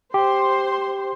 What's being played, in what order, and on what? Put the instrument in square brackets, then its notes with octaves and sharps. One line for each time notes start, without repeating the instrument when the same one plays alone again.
[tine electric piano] G4 [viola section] C5 C6